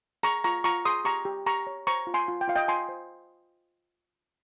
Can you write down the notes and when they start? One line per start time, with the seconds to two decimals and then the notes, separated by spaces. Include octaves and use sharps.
0.23 G#4 A#5 C#6
0.44 F4 A#5 C#6
0.64 F4 A#5 C#6
0.85 G#4 C6 D#6
1.05 G4 A#5 C#6
1.25 G4
1.46 G4 A#5 C#6
1.67 C#5
1.87 C5 A#5 C#6
2.07 F4
2.14 G#5 C6
2.28 F4
2.41 G5
2.48 F4 F5
2.55 D#5 G5
2.68 F4 G#5 C6
2.89 C5